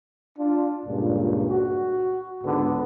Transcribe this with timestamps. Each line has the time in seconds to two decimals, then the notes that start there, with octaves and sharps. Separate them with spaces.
0.38 D4 F4
0.86 C#2 G2 A#2
1.48 F#4
2.44 C#2 G#2 D3 B3